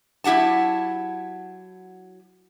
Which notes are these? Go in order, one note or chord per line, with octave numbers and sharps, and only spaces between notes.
F#3 E4 G4 F#5 A5